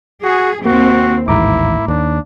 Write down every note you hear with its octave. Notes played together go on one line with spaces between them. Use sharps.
F#4 G#4
D#2 A#3 C4 F#4
A1 D#2 G#2 A#3 E4 A#5 D6
D#2 D4